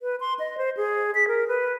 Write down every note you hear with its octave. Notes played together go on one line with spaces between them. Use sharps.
B4
C6
D#5
C5
G#4
B6
A#4
B4